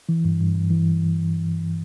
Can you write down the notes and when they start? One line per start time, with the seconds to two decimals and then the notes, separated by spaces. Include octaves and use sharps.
0.09 E3
0.25 G2
0.41 G2
0.55 G2
0.71 E3